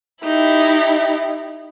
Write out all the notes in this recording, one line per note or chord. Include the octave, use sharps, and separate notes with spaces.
D#4 E4 G4